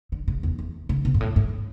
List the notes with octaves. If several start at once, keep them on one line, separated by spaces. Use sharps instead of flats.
D3
C#3
E2
E2
C#3
B2
G#2
A2
G#2